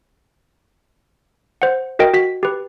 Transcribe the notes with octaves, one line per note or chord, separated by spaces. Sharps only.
C5 F#5
F#4 A#4 D#5 G5
F#4 B6
G4 B4